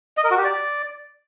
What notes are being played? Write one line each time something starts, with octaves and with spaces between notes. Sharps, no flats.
D#5
A#4
F#4
G4
D5